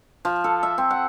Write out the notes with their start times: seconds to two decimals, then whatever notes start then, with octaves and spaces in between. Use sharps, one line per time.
0.25 F3
0.44 A4
0.63 E5
0.78 C4
0.91 F#5